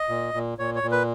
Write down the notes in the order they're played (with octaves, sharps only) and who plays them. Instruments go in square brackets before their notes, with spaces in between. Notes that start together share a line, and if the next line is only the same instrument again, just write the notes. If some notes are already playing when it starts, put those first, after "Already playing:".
Already playing: [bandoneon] D#5
A#2
A#2
A#2 C#5
C#5
A#2
B4